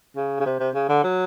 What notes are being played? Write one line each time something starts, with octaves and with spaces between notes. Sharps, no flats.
C#3
C#3
C3
C3
C#3
D3
F#3